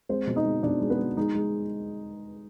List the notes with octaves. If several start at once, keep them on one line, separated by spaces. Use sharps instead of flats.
G#3 C4 C5
B2
D#4 D#5
G#3
B2 D4 D5
G#3
B3 B4
G#3
G#3 D#4
G#3